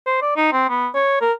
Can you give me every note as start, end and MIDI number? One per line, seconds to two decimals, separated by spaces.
0.06 0.18 72
0.22 0.35 74
0.37 0.51 63
0.53 0.66 60
0.69 0.88 59
0.95 1.21 73
1.21 1.32 70